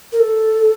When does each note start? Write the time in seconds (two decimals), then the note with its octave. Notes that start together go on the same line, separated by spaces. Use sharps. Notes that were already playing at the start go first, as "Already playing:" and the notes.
0.12 A#4
0.20 A4